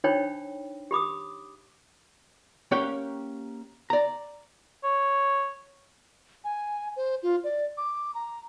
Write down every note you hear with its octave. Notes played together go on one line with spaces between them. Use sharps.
D4 D#4 C5 C#5 G5 B5
G4 B5 D6 D#6
A#3 C#4 G4 C#5 F#5 G5
D5 A#5
C#5
G#5
C5
F4
D5
D6
A#5